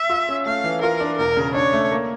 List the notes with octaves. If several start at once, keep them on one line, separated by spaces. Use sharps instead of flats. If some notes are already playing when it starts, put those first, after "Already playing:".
Already playing: E5
F4
C#4
A3 F5
E3
F4 A#4
D4
E1 A#4
C#3
D4 C#5
A3
A#3